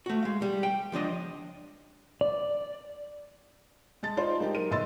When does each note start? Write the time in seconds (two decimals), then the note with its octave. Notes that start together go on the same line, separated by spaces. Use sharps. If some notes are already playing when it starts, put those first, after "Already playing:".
0.06 A3 F#4
0.23 G#3 F5
0.42 G3
0.63 G5
0.92 C#2 F3 D4 D#5
2.21 D5
4.03 G#3 A5 A6
4.17 D#4 F4 C5 D5 C6
4.40 G#3 A#3 D#4 G4
4.54 F#3 A#4 D#7
4.71 G1 D#5 C6 E6 A6